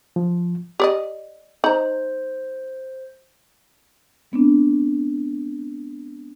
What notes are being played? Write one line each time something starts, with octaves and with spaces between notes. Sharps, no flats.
F3
G4 D5 D#5
D#4 C5 A#5 G6
G#3 B3 C4 D4